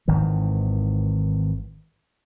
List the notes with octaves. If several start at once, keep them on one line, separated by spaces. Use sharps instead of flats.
G#1 D#3 E3